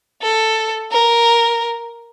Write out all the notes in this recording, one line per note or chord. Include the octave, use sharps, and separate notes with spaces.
A4
A#4